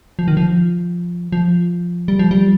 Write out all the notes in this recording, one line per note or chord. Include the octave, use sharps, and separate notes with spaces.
F3
D#3
F3
F3
G3
F3
G3